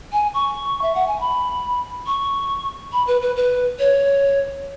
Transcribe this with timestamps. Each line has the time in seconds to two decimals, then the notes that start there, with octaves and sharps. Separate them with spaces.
0.12 G#5
0.34 C#6
0.82 E5
0.95 F#5
1.07 G#5
1.20 B5
2.07 C#6
2.93 B5
3.07 B4
3.22 B4
3.36 B4
3.79 C#5